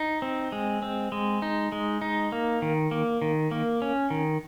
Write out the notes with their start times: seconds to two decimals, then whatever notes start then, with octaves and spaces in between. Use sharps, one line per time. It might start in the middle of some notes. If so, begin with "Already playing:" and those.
Already playing: D#4
0.22 C4
0.52 G#3
0.83 C4
1.12 G#3
1.42 D#4
1.72 G#3
2.01 D#4
2.32 A#3
2.62 D#3
2.91 A#3
3.22 D#3
3.51 A#3
3.82 C#4
4.10 D#3